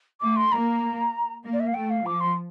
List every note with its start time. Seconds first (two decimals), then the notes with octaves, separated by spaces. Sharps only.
0.21 A3 D6
0.36 C6
0.52 A#3 A#5
1.44 A#3
1.53 D5
1.60 E5
1.67 F5
1.74 A3 G5
1.90 F5
2.05 F3 D6
2.20 C6